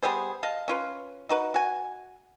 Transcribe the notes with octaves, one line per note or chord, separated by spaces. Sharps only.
G3 B3 G#4 C5
D#5 F5 A5
C#4 F4 B4
D#4 F#4 B4
F#4 G#5